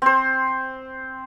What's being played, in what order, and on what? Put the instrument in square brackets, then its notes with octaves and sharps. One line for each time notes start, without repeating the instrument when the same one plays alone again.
[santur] C4 C5